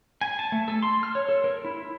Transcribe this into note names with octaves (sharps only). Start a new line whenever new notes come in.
G#5
A5
A3
A4
C6
F6
C#5
A4
A#4
E4